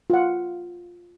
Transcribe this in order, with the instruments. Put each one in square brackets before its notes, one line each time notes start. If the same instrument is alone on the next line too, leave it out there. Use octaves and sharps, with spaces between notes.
[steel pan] F4 F#5